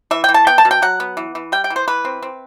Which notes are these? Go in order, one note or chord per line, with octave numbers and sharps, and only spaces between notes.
E3 E5
E3 G5
A5
B3 G5
A5
B2
G5
F#3 F#5
B3
E3
E3
G3 G5
G5
E3
C5
E3 B4
C4
C4